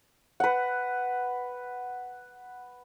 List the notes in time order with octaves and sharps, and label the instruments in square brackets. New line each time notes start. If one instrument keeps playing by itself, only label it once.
[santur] B4 F#5